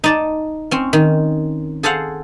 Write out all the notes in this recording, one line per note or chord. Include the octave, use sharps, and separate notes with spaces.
D#4 D5 A5
C4 C#4
D#3
G#4 A4 C5 F5 F#5